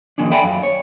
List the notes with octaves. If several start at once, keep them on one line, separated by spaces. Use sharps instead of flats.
D#3 F3 A#3 C#4 D4
A4 D5 E5 G5 G#5 B5
F#2 F5
C#5